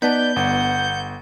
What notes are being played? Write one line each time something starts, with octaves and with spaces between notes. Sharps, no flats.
B3 D#4 B4 D5 A5 G6
G1 F#5